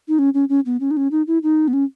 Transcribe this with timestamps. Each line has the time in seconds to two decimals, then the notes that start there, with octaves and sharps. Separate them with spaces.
0.08 D#4
0.19 C#4
0.34 C#4
0.49 C#4
0.66 B3
0.80 C#4
0.91 D#4
0.97 C#4
1.11 D#4
1.27 E4
1.43 D#4
1.68 B3
1.73 C#4